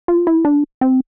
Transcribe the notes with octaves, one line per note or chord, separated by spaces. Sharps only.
F4
E4
D4
C4